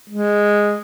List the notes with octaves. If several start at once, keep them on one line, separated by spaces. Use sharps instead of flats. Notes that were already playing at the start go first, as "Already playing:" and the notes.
G#3